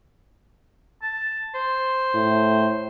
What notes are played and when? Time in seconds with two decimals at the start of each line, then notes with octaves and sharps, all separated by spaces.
1.02 A5
1.55 C5
2.15 A2